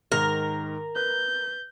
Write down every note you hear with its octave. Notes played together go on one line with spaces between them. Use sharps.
G#2 D#3 A#4
B4 F#6 G6